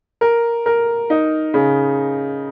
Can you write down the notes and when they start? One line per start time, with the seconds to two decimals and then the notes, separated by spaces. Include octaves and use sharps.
0.21 A#4
0.66 A#4
1.10 D#4
1.54 C#3